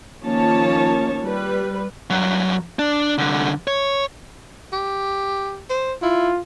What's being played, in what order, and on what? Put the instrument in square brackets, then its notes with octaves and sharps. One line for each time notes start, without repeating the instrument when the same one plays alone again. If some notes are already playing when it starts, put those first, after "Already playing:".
[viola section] D#3 F3 A#3 C#4 C#5 A5
G3 B4
[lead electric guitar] G2 F#3
D4
C2 D3
C#5
[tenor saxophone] G4
C5
[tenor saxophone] E4 [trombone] F4